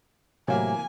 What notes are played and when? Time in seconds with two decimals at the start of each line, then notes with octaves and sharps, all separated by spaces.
0.48 A2 C3 E3 F#3 A#3 G#5